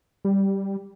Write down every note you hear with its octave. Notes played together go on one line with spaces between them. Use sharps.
G3